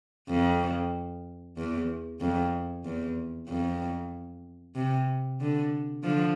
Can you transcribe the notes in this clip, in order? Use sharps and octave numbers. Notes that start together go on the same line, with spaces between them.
F2
E2
F2
E2
F2
C3
D3
D3 F3